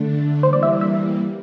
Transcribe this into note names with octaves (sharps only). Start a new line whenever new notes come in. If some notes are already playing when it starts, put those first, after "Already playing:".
Already playing: D3 A3 D4
E3 G3 A#3 C5
D5
E5
E5